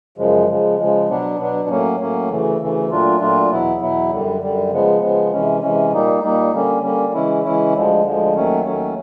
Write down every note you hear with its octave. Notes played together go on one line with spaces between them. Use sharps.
F#2 C#3 F3 G#3
C#3 F3 G#3
C#3 F3 G#3
B2 F#3 B3 D4
B2 F#3 B3 D4
A2 F#3 A#3 C#4
A2 F#3 A#3 C#4
D2 C#3 E3 A3
D2 C#3 E3 A3
A#2 F#3 A3 D4 F4
A#2 F#3 A3 D4 F4
E2 B2 F#3 B3 E4
E2 B2 F#3 B3 E4
F#2 D3 G3
F#2 D3 G3
C#3 F3 G#3 B3
C#3 F3 G#3 B3
C3 E3 G#3 C#4
C3 E3 G#3 C#4
A#2 G3 A#3 D#4
A#2 G3 A#3 D#4
D3 G3 A#3 C#4
D3 G3 A#3 C#4
C#3 E3 G#3 C#4 E4
C#3 E3 G#3 C#4 E4
D2 D3 F3 G#3
D2 D3 F3 G#3
D#2 D#3 F#3 A3 C#4
D#2 D#3 F#3 A3 C#4